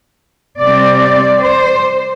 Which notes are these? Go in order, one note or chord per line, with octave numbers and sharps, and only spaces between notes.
C3 G3 C4 D5
D5
C5